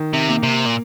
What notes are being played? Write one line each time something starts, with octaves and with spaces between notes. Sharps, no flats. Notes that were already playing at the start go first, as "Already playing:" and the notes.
Already playing: D#3
C3
A#3
C3
A#2